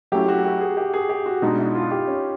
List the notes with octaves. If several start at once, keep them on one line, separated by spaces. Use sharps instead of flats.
F#3 A3 C#4 E4 G4
F#4
G4
G#4
G4
G#4
G4
F#4
B2 G#3 B3 D4 D#4
E4
F4
G4
C#4